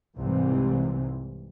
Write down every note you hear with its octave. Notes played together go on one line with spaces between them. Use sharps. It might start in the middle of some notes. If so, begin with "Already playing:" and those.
C2 G#2 C3 E3